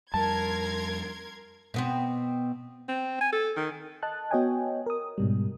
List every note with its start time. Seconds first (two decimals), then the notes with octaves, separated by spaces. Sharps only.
0.14 F2 G3 A#4 A5 C6 G#6
1.74 B2 B3 C4
2.89 C4
3.21 G#5
3.33 A4
3.57 D#3
4.03 D#5 A5 F#6
4.31 B3 F#4 C#5 D#5 G5 G#5
4.86 A#4 D#6
5.18 G#2 B2 G3